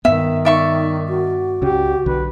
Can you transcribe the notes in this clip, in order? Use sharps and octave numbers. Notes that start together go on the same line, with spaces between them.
G2 D#3 B3 E5
D#4 D5 E5 C#6
F#4
C#2 C#3 G4
B1 D3 B4